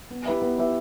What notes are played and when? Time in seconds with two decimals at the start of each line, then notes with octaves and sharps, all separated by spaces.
0.11 B3
0.26 E4 G4 B4 E5
0.42 B3
0.58 E4 G4 B4 E5